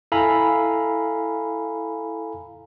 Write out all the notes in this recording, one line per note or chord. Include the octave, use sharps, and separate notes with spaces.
E4 A4 F5 G#5 A#5 B5